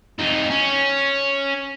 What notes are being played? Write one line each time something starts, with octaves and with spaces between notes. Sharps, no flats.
F2 D#4
C#4